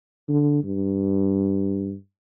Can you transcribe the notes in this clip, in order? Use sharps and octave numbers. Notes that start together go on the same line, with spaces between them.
D3
G2